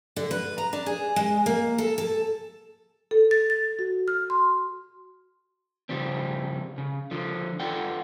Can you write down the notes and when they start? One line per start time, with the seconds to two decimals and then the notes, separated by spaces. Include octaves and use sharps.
0.16 D3
0.31 B4
0.58 A#5
0.73 D4
0.86 G#4
1.16 G#3
1.46 A#3
1.78 A4
1.98 A4
3.11 A4
3.31 A6
3.50 A6
3.79 F#4
4.08 F6
4.30 C6
5.89 C#3 F3 G3 C4
6.78 C#3
7.11 D3 F3
7.60 F4 A4 D5 F#5 G5